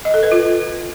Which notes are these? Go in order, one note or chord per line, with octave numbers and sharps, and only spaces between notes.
D#5
A4
B4
F4